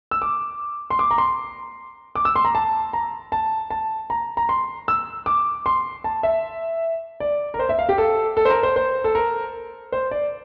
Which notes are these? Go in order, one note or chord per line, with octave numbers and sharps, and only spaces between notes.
E6
D6
C6
D6
A#5
C6
D6
E6
C6
A#5
A5
A#5
A5
A5
A#5
A#5
C6
E6
D6
C6
A5
E5
D5
A#4
C5
E5
F5
G4
A4
A4
C5
A#4
C5
C5
A4
A#4
C5
D5